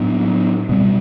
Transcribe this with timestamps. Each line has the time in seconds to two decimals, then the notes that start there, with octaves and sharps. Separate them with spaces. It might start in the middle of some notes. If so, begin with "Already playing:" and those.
Already playing: A2 F#3 B3 D4
0.69 B2 G3 C4